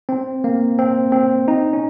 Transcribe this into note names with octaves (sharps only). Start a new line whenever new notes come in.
C4
A#3
C4
C4
D#4
C#4